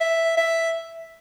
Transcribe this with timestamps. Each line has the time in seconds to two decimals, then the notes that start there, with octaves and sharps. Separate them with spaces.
0.01 E5
0.37 E5